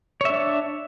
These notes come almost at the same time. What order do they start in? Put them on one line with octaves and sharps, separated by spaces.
C#5 E5 D4